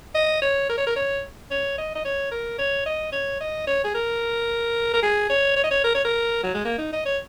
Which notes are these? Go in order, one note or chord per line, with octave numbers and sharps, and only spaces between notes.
D#5
C#5
A#4
C#5
A#4
C#5
C#5
D#5
D#5
C#5
A#4
C#5
D#5
C#5
D#5
C#5
G#4
A#4
A#4
G#4
C#5
C#5
D#5
C#5
A#4
C#5
A#4
F#3
G#3
A#3
D#4
D#5
C#5